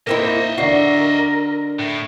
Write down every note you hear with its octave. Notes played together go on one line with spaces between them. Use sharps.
A#3 C4 D#4 E4 D#5 E5
D3 F#4 A#4 D5 C7
A2